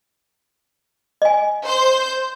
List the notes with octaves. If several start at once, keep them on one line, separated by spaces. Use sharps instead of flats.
D#5 G#5
C5 C6 G6